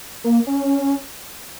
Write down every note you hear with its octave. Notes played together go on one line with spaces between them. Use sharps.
A#3
C#4